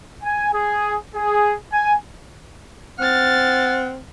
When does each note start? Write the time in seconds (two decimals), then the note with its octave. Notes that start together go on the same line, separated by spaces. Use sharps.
0.24 G#5
0.53 G#4
1.14 G#4
1.71 G#5
2.99 C4 F#5 F6 A6